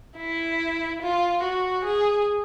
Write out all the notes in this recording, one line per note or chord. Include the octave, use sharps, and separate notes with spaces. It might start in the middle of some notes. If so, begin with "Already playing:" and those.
E4
F4
F#4
G#4